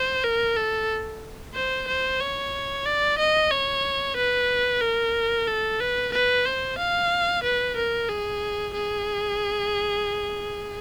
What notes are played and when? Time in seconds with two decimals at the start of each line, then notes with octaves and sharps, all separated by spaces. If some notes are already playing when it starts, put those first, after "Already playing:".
Already playing: C5
0.24 A#4
0.57 A4
1.54 C5
1.88 C5
2.20 C#5
2.85 D5
3.18 D#5
3.51 C#5
4.16 B4
4.82 A#4
5.47 A4
5.80 B4
6.12 B4
6.45 C5
6.78 F5
7.43 B4
7.76 A#4
8.09 G#4
8.74 G#4